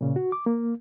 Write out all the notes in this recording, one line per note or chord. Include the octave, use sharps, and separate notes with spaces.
A#2 C#3
F#4
D6
A#3